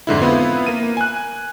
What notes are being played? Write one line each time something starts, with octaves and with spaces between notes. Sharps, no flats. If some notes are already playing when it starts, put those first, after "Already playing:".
F2 G#2 D3 E4
B3 C4 E4 F4 B4
A#3 D#7
G#5 F#6